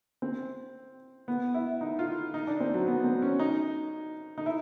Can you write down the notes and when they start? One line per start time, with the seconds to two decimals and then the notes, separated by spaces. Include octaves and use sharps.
0.22 C4
1.28 B3
1.54 E4
1.81 D#4
1.99 F4
2.34 D#4
2.47 D4
2.60 C4
2.74 F#3
2.87 B3
3.04 C4
3.22 C#4
3.39 D#4
4.38 D#4
4.46 E4